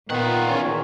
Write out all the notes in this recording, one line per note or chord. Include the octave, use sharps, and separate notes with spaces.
A#2 D#3 B3 F4 F#5
E2 D#3 C#4